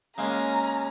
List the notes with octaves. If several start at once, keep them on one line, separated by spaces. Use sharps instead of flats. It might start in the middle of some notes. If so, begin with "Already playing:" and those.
C#3 G#3 A#3 C#4 A#5